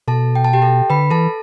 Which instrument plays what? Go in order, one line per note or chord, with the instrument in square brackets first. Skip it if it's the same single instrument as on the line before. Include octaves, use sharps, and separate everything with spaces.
[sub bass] B2 [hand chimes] A4 A5
[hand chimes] G5
A5
G4 G5
A4 A5
[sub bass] D3 [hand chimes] B4 B5
[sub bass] E3 [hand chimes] A4 A5